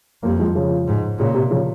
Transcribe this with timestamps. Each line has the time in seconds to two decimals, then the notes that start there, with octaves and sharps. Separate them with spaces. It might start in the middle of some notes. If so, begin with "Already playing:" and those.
0.23 F2 G3 A#3
0.39 F3 G#3
0.55 C#3 F3
0.87 G#2
1.19 A#2 C#3
1.34 C3
1.51 C#3 F3